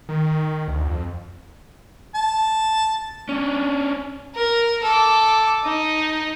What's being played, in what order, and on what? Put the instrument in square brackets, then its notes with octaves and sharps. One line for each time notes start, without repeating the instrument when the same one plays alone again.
[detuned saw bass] D#3
D2
F2
[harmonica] A5
[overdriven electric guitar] C#4 D4
[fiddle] A#4
A4 D6
D#4